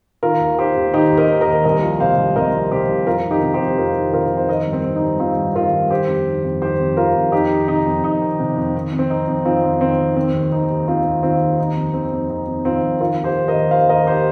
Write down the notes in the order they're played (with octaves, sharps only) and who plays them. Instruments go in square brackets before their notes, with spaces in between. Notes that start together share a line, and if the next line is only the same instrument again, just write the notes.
[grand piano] D#3 F4 A#4
D#2
D#3 G4 C5
D#2
D#3 D#4 G4
D#2
A#4 D#5
D#3
A#4 D#5
D#2
C2 A#4 D#5
F3
C3 C5 F5
C2
C2 A#4 D#5
F3
C3 G4 C5
C2
F2 F4 A#4
D#3
D#4 G4
C3
G4 C5
F2
F2 F4 A#4
D#3
C3 F4 A#4
F2
C5
D#3 A#4 D#5
G2
C4
D#3
D#4
G2
D#3 C4 F4
G2
D#3 F4 A#4
G2
D#3 G4 C5
F2
D#3
F2
D#3 G4 C5
F2
D#3 F4 A#4
F2
F2 D#4 G4
D#3
C3 D#4
F2
F2 D#4
D#3
C3
F2
D#3
F2
C4
D#3 D#4
F2
D#3 C4 F4
F2
D#3 C4
F2
D#3 C4
D#2
D#3 D#4
D#2
D#3 C4 F4
D#2
D#3 C4 F4
D#2
D#3 D#4
F2
D#3 C4
F2
D#3 D#4
F2
D#3 C4 F4
F2
D#3 F4 A#4
D#2
G4 C5
D#3
A#4 D#5
D#2
D#3 C5 F5
D#2 A#4 D#5
D#3 G4 C5